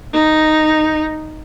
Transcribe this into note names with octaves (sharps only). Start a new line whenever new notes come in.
D#4